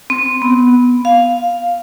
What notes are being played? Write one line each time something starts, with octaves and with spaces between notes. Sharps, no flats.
C4
B3
F5